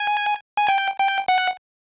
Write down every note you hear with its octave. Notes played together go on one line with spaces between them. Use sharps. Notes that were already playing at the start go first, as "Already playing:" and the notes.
Already playing: G#5
G#5
G5
G5
F#5